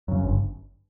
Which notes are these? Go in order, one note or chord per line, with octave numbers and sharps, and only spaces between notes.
F#2 C#3
G1